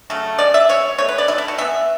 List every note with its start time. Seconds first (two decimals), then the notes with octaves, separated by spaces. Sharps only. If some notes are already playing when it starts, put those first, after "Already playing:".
0.10 C#3 F#3 A3
0.38 B2 G#3 D5
0.54 E5
0.69 B2 G#3 C#5
0.98 B2 A3 C#5
1.08 B4
1.18 D5
1.28 B2 A3 E4
1.38 E4
1.48 F#4
1.58 E3 B3 E5